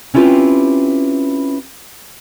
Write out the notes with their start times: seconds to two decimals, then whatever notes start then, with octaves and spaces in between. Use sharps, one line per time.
0.14 C4 C#4 E4 F4 G4 B4